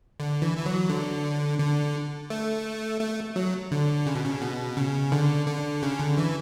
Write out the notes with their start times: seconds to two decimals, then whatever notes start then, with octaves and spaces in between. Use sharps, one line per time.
0.20 D3
0.42 E3
0.57 E3
0.66 F#3
0.90 D3
1.59 D3
2.30 A3
3.01 A3
3.36 F#3
3.71 D3
4.06 C#3
4.15 B2
4.24 C#3
4.42 B2
4.77 C#3
5.12 D3
5.47 D3
5.82 C#3
5.99 D3
6.18 E3